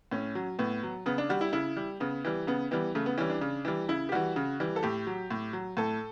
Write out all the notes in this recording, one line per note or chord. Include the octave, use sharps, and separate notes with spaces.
A2 C#4
F#3
A2 B3
F#3
C#3 B3
D4
G3 F#4
E4
C#3 E4
G3
C#3 B3
E3 G3
C#3 B3
E3 G3 B3
C#3 A3
B3
E3 G3 C#4
D4
C#3
E3 G3
C#3 E4
G4
E3 G3 F#4
C#3
E3 G3
A4
A2 G4
F#3
A2
F#3
A2 A4